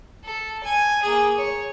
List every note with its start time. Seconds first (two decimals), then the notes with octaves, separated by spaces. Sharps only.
0.24 A4
0.63 G#5
1.03 A#3 G#4
1.37 C#5